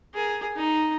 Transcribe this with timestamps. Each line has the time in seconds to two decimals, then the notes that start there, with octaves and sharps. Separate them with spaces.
0.14 G#4 A#4
0.56 D#4